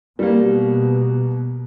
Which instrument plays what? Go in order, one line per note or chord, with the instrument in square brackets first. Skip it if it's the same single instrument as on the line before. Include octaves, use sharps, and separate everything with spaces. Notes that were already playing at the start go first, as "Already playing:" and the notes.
[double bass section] B2 [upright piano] G3 A#3